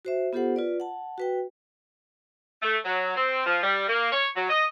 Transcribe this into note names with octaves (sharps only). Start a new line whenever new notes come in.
F#4 C5 E5
B3 F4 G4 A4 C5 F#5
F4 B4 D5
F#5 A5
F#4 B4 G5
A3
F#3
C4
F3
G3
A#3
C#5
F#3
D#5